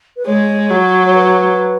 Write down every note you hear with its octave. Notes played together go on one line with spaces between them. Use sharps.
B4
G#3 C#5
F#3
C#5
B4